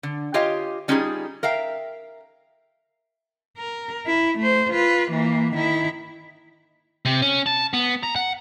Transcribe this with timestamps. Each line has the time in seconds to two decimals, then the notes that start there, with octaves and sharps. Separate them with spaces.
0.03 D3
0.34 F4 G4 C#5 D#5 F5 G#5
0.88 G3 C#4 D#4 F4 F#4 G#4
1.43 A#4 E5 F5 G5
3.58 A#4
4.07 E4
4.39 A3 C5
4.72 F4 B4
5.11 E3 A#3
5.56 D#3 E4
7.05 C3
7.22 C#4
7.46 A5
7.73 B3
8.03 A#5
8.16 F#5